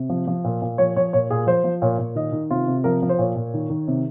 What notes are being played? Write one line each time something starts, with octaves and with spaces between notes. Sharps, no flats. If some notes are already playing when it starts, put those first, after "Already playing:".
Already playing: C3
F3
F3
A#2
A#2
F3 C#5
F3 C#5
A#2 C#5
A#2 G#4
F3 C5
F3
A#2 C#5
A#2
D#3 D#5
D#3
C3 F4
C3
F3 A#4
F3
C5
A#2 C#5
A#2
D#3
D#3
C3